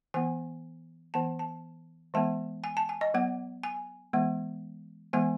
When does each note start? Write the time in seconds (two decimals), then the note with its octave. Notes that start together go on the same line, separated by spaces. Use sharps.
0.14 E3 B3 G#5
1.14 E3 B3 A5
1.39 A5
2.14 E3 G#3 B3 A5
2.64 G#5
2.77 A5
2.89 G#5
3.01 D#5
3.14 F#3 B3 F#5
3.63 G#5
4.13 E3 G#3 B3
5.13 E3 G#3 B3 G#5